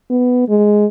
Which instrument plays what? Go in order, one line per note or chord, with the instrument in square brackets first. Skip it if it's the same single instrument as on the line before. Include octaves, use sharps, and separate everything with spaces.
[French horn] B3
G#3